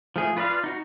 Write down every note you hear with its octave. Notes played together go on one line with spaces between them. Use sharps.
F3 A3 G#4
F4 B4 D5 D#5 F5
D#4 F#4